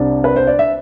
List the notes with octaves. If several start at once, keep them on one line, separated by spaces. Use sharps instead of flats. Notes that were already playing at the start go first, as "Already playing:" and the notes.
Already playing: C2 C3 G3 C4 D4 D5
B4
C5
D5
E5